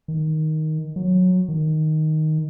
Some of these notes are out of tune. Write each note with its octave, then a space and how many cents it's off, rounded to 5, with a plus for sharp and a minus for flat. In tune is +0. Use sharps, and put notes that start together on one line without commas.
D#3 +5
F#3 -15
D#3 +0